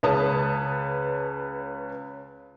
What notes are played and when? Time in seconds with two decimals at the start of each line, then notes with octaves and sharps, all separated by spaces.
0.03 C#2 B4 C#5 A5 D#6